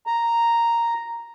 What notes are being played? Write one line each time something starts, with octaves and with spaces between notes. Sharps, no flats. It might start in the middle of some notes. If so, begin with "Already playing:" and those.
A#5